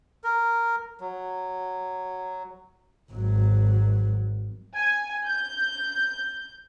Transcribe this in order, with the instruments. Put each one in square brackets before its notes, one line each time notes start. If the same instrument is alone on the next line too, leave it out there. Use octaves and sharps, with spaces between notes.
[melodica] A#4
F#3
[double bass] G#1 F#3
[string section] G#5
G6